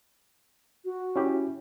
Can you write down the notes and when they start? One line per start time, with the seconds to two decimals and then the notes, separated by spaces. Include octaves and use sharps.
0.85 F#4
1.16 C#4 E4 G4